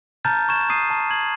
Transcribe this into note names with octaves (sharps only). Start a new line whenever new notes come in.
A5 A#5 F6 G6 A6
A5 C#6 G#6 E7
D#6 C7 D#7 E7
A5 G6
G#6 F#7